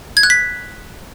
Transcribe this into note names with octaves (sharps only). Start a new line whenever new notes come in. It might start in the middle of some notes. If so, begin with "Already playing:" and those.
G#6
F#6
B6